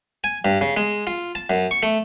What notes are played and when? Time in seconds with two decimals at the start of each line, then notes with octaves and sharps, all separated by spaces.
0.24 G#5
0.45 G2
0.61 C#3
0.77 G#3
1.07 F4
1.35 A5
1.50 F#2
1.71 C#6
1.83 A3